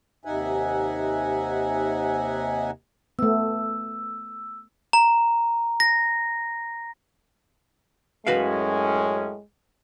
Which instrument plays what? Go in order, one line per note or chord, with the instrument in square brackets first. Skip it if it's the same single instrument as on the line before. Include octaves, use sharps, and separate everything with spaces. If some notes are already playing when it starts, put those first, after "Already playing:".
[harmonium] D#2 C3 D#4 E5 F#5 G#5
[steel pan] A3 B3 [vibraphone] E6
[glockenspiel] A#5
A#6
[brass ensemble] F#2 A2 C#4 [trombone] G#3 [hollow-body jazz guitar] F#4 B4 F5